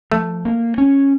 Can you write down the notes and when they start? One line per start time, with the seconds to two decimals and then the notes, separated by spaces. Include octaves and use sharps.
0.12 F3 A3
0.45 A#3
0.78 C#4